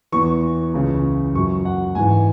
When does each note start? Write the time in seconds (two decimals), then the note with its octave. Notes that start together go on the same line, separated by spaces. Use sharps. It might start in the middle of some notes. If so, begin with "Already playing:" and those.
0.12 E2 E3 C#6
0.74 C#2 C#3 E3
1.34 F#2 F#3 C#6
1.65 F#5
1.95 G#2 E3 G#5